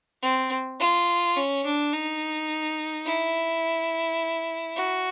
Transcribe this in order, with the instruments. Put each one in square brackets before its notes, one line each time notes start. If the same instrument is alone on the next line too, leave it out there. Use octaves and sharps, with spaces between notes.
[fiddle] C4
F4
C#4
D4
D#4
E4
F#4